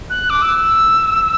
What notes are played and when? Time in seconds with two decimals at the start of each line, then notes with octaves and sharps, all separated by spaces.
0.10 F#6
0.30 D6
0.42 E6